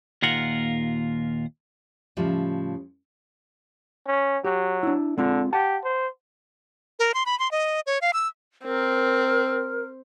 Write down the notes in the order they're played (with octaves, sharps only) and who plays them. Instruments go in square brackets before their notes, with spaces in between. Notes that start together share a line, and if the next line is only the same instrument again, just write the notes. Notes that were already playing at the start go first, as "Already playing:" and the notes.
[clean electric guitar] D#2 A#2 F4 A#4 F#5
[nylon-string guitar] A2 C#3 F3 G3
[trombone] C#4
[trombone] F#3 [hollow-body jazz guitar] G4
[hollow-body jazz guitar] D4 E4
[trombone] D3 [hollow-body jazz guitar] G#3 C4 F4
[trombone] G4 [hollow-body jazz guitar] F#5 A5
[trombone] C5
[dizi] A#4
C6
B5
C6
D#5
C#5
F5
E6
[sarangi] C4 [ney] A#4